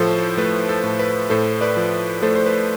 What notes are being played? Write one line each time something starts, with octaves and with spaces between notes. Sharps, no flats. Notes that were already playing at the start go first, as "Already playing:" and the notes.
Already playing: A2 F3 A4 C5
A3 B4
A4
A2
B4
A2 A4 C5
B4 D5
F3
A3 A4 C5
C5
B4